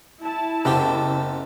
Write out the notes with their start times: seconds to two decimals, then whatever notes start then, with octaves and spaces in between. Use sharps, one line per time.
0.23 E4 A5
0.65 F#1 B3 C4 G4